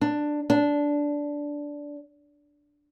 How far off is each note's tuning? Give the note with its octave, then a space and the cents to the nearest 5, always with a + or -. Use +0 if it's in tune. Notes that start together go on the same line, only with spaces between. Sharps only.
D4 +10
D4 -10